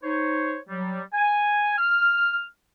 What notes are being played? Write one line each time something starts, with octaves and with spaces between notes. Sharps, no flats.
D#4 C5 C#5
F#3 G3
G#5
F6